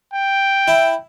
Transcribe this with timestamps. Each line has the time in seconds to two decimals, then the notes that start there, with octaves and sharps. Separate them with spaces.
0.14 G5
0.68 E4